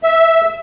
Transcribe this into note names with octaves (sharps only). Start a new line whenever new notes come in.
E5